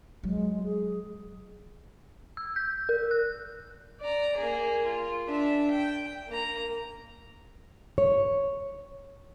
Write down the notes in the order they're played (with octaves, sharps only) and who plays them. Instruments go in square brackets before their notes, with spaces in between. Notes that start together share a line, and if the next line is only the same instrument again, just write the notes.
[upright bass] F#3 [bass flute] G#3
[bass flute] G#4
[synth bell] E6
G6
A#4
F#6
[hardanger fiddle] D5 A#5
A#3 G#4
F4
D4 E5
G5
A#3 A#5
[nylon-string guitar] C#5